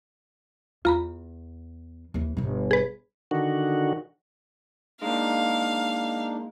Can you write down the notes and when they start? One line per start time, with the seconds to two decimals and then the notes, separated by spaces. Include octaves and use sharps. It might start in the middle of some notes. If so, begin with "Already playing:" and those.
0.85 E2 F4 A#5 B5
2.14 D#2 E3
2.37 G1 B2
2.71 G#4 B4
3.31 D3 D#3 F#4
5.02 A#2 G#3 A#3 D4 D#4 F5